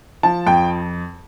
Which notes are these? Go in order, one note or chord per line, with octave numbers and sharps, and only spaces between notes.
F3 A5
F2 G5